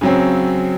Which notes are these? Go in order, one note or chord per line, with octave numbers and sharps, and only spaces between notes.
C#3 F#3 C4